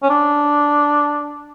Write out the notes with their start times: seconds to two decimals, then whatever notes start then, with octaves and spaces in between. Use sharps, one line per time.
0.03 C#4
0.10 D4